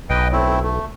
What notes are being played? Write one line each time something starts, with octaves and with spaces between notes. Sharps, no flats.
B1 B4 D#5 G5
A3 C4 E4
A3